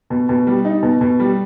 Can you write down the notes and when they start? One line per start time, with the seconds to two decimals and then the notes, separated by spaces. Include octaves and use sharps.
0.10 B2
0.29 B2
0.47 G3
0.65 D#4
0.83 B2
1.01 B2
1.20 G3